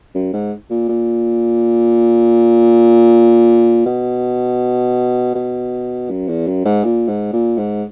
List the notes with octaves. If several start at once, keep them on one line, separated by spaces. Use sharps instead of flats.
F#2
G#2
A#2
A#2
B2
B2
F#2
E2
F#2
G#2
A#2
G#2
A#2
G#2